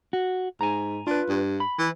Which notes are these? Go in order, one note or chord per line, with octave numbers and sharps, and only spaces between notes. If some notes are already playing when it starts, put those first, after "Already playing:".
F#4
G#2 G#5 A#5
D4 F4 B4
G2
B5
E3